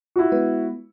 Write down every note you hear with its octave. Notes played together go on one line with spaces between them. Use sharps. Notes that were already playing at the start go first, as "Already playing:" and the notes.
E4 F#4
G#3 B3 B4